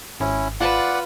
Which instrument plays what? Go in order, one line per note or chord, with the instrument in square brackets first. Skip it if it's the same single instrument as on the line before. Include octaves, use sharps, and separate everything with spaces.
[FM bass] G#1 [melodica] C#4 E4
[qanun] F4 A5 [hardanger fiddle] B4 [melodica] D5 F#5